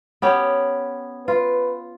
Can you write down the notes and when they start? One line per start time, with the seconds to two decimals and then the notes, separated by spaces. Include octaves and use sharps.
0.22 B3 C#4 G4
1.28 F4 B4